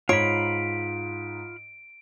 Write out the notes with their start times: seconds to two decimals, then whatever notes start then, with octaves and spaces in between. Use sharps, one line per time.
0.09 G#2 D#4 F4 C#5 B5 D7